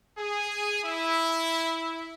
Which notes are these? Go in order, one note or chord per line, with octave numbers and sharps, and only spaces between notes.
G#4
E4